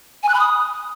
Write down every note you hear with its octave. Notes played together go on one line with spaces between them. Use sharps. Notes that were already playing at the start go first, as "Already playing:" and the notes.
G#5
F#6
B5
D#6